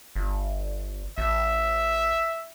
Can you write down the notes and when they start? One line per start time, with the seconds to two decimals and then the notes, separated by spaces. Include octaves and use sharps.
0.16 G1
1.18 A1 E5